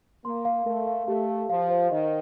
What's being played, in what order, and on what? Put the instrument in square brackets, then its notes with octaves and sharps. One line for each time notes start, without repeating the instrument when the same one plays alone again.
[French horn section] A#3 [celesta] C6
[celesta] F5
[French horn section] A3 [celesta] A#4
[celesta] F5
[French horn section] A3 [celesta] G4
[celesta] F5
[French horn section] F3 [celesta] F5
[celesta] C5
[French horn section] D#3 [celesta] D#5